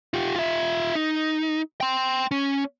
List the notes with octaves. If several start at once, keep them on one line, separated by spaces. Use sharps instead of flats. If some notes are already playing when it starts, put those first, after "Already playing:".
F4 G4
F4 E5
D#4
G5 C6
C#4